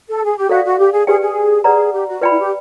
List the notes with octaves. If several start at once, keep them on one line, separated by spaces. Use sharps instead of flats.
A4
G#4
G4
F#4 A4 D5 F5
F#4
G4
G#4
G4 G#4 B4 D5 G5
G#4
G#4 B4 D5 F#5 A#5
G4
F#4
F4 B4 D5 G5 B5
E4
G4